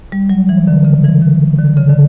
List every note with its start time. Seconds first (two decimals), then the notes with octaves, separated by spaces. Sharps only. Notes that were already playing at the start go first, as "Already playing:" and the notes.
0.12 G3
0.30 F#3
0.49 E3
0.67 D3
0.85 C#3
1.04 E3
1.22 D3
1.59 D3
1.77 C#3
1.89 D3